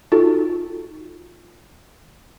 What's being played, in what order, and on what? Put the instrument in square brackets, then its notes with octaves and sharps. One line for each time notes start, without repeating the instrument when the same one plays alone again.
[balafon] D#4 F4 F#4 A4